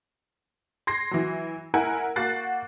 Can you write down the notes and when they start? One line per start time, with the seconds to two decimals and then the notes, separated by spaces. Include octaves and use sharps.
0.87 C6 G#6 A#6 C7
1.11 E3 F#3
1.74 E4 A#4 F#5 G#5
2.16 A#3 F#4 F#5 F#6 A6 C7